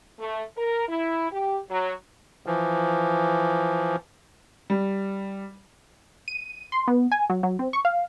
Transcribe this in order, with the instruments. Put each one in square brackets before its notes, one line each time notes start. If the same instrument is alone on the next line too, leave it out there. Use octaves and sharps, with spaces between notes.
[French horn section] A3
A#4
E4
G4
F#3
[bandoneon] E3 F3
[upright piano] G3
[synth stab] D#7
C6
B3
G#5
F#3
F#3
C4
C#6
F5